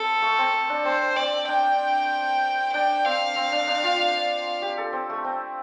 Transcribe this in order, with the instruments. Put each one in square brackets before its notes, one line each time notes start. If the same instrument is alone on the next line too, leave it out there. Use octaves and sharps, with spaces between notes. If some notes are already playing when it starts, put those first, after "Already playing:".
Already playing: [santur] C4 [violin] A4
[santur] A3
C4
D4
[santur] C4 [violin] C5
[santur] C4 [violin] D5
[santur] D4 [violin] G5
[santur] D4 [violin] G5
[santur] C4 [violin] F5
[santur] C4
D4
D4
F4
G4
A4
C4
A3
C4